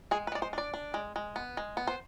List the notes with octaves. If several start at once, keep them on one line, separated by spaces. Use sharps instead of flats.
G#3 G#4
B4
G#3 D5
C5
D4 D5
D4
G#3
G#3
B3
G#3
B3
C5